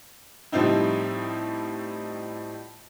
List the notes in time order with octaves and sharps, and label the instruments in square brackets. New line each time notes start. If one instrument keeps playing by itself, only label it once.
[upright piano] A2 F3 G3 C4 D#4 E4